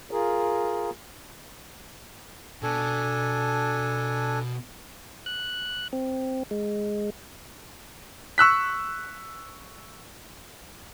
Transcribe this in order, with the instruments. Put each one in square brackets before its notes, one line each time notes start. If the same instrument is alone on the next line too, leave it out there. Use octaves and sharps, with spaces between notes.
[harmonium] F4 G#4 A#4
[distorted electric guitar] B2 [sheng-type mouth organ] D4 A4 G#5
[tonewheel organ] F#6
C4
G#3
[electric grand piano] C#6 E6 F#6 B6